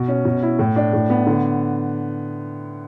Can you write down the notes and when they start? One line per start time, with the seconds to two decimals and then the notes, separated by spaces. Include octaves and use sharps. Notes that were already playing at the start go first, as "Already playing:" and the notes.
Already playing: B2
0.08 C#4
0.25 B2
0.43 E4
0.59 A2
0.76 D4
0.93 A2
1.10 B3
1.27 D3